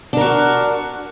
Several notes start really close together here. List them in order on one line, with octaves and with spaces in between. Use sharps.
D4 A#4 F#4